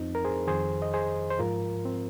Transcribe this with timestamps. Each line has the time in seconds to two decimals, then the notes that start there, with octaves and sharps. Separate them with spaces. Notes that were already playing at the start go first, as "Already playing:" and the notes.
Already playing: F2 F3 C4 D#4
0.15 A#4
0.25 G#4 C5
0.47 F2 D#3 G#4 C5
0.82 D#5
0.94 G#4 C5
1.31 C5
1.39 G#2 F3 F4 A#4
1.85 C4